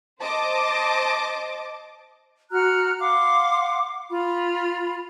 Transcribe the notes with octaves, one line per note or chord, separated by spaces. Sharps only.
C5 D#5 A5 D6
F#4 A#5 F6 F#6
F5 F#5 C6 D6
F4 B5